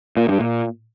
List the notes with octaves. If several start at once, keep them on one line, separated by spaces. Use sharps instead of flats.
A#2
G2
A#2